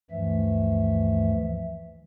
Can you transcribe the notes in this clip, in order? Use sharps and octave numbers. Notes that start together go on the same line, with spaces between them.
D2 G2 E3 F3 A3 E5